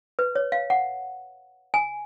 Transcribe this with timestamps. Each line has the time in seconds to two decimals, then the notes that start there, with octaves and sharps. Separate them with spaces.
0.19 B4
0.36 C#5
0.52 F5
0.70 F#5
1.74 G#5